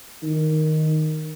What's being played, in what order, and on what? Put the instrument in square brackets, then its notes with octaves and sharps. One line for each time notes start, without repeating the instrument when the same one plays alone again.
[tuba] D#3